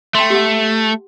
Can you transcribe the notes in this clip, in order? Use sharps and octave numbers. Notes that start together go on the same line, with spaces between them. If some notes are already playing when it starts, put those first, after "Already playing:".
A3 G5 C6
G4 F#5